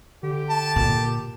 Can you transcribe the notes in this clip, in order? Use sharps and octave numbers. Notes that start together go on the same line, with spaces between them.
D3 G4
A5
A#2